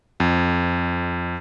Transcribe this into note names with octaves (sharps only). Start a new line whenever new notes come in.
F2